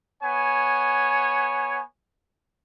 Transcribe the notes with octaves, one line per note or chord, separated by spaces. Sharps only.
B3 C#5 G#5